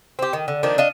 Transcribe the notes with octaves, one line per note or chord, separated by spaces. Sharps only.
C4 G4
D#3
D3
D#3 F3 A#3 D4
D4 D#5 F5